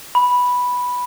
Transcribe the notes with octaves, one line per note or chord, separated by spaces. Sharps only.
B5